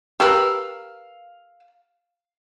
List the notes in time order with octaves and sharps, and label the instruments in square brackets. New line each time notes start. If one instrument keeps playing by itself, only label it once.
[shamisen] G4 A#4 B4 [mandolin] F5 E6